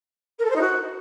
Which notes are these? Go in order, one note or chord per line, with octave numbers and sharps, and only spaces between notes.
A#4
A4
C5
D#4
F#4